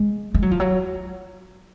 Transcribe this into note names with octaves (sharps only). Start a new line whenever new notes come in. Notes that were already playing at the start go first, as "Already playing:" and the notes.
Already playing: G#3
G#3
F#3
F3
F#3